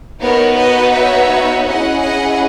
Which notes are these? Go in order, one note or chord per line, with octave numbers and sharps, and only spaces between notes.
B3 D#4 F#4 A#4 C#5
B4 D#5
C#5 E5
C#4 E4 G#4 D#5 F#5
D#5 F#5